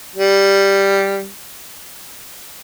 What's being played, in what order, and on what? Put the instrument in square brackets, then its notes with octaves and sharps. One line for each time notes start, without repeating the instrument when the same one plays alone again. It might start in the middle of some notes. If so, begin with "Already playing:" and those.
[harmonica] G3